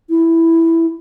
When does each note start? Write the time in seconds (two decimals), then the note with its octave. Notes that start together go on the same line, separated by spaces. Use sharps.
0.10 E4